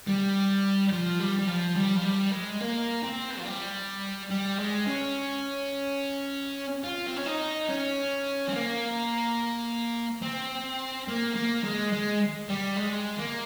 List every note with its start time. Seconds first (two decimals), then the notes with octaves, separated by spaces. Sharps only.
0.07 G3
0.92 F3
1.20 G3
1.39 G3
1.47 F3
1.76 G3
1.96 F3
2.04 G3
2.32 G#3
2.61 A#3
3.03 C4
3.38 F3
3.45 G3
4.30 G3
4.58 G#3
4.87 C#4
6.84 F4
7.07 C4
7.16 C#4
7.26 D#4
7.69 C#4
8.49 C4
8.53 A#3
10.22 C4
11.08 A#3
11.36 A#3
11.64 G#3
11.92 G#3
12.49 G3
12.77 G#3
13.19 A#3